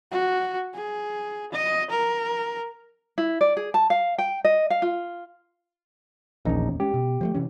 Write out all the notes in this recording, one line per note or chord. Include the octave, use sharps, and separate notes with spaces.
F#4
G#4
D#5
A#4
E4
D5
G#4
A5
F5
G5
D#5
F5
F4
D#1 A#1 E2 C#4 D#4
G#3 C#4 G4
B2
F3 G#3 A3
C3 E3 C#4